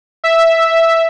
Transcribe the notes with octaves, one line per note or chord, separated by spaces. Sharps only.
E5